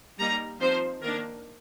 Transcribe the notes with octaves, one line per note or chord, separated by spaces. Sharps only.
G3 A#3 D#4 A#5
F3 C4 D#4 C5
D#3 A#3 D4 A#4